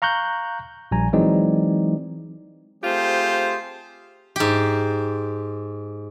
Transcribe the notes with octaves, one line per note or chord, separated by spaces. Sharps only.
F5 A#5 C#6 F#6 G6
A#1 G3 G#5 A#5
E3 F#3 G#3 C4 D#4 D5
A3 C4 F4 G4 G#4 C5
G#2 G4